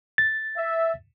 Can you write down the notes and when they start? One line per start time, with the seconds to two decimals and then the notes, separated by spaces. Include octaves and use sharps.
0.18 A6
0.57 E5